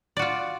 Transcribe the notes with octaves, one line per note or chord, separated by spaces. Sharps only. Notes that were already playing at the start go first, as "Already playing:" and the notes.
F4 F#4 D5